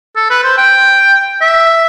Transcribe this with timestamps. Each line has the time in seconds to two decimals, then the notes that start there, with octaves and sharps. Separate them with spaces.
0.16 A4
0.30 B4
0.44 C5
0.58 G5
1.41 E5